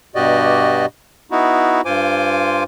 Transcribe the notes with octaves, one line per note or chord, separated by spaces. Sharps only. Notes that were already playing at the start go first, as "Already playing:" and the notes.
G2 B2 F#4 G4 D5 D#5
B3 D#4 E4 F#4
G2 F4 C5 G#5 D6